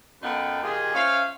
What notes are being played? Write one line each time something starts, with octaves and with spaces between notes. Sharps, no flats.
F#2 B3 D#4 F4 A4 G5
A#2 D#3 F4 G4 G#4
C#4 F4 C5 E5 F5